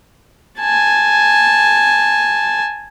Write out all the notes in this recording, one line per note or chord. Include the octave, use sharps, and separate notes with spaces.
G#5 A5